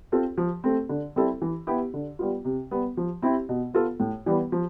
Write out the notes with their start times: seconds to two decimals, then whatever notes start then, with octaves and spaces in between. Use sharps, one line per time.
0.12 C4 F4 A4
0.38 F3
0.64 A3 C4
0.89 D3
1.16 G3 C4 E4 A4
1.42 E3
1.67 B3 E4 G4
1.94 D3
2.19 G3 B3 F4
2.45 C3
2.71 G3 B3
2.97 F3
3.22 C4 E4 G4
3.49 B2
3.74 B3 F4 A4
4.00 A2
4.26 E3 G3 B3
4.52 F3